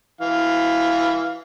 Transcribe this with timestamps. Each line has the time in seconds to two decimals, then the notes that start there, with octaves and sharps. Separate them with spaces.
0.21 E3 F5